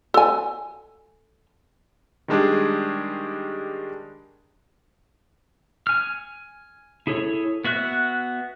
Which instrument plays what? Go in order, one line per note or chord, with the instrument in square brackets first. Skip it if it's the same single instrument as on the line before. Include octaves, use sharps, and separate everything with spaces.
[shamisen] A4 G#5
[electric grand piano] D#3 G3 G#3 D4 G4 G#4
[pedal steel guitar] G#5 F6
E4 G#4 A4 C#5
B3 F#4 E5 F#6